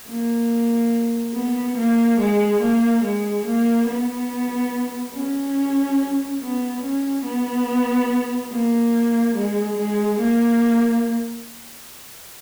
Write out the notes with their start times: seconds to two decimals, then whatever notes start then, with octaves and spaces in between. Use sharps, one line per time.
0.09 A#3
1.35 B3
1.77 A#3
2.20 G#3
2.61 A#3
3.04 G#3
3.46 A#3
3.88 B3
5.14 C#4
6.41 B3
6.82 C#4
7.25 B3
8.52 A#3
9.36 G#3
9.78 G#3
10.20 A#3